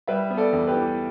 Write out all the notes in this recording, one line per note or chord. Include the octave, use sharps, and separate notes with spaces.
G3 B4 E5
B3
A4 D5
E2
G4 B4
E3